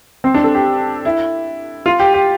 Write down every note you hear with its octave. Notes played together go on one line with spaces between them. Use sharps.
C4
D4
A4
G4
E4
F4
G4
G4